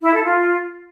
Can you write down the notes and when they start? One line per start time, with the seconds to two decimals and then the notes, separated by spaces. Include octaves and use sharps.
0.04 E4
0.14 A4
0.24 F4